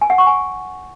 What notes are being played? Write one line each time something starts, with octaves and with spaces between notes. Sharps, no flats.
G#5
F#5
C#6
G#5